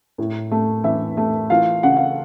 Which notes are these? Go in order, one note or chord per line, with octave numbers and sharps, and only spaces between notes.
A2
A3
E3 E4 E5
A3
E3 F4 F5
C#3 F#5
F5